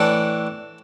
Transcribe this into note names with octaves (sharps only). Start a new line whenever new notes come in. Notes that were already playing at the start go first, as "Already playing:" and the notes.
Already playing: A2 E3 D4 A4 A5